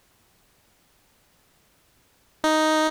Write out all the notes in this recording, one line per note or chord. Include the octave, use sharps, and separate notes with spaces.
D#4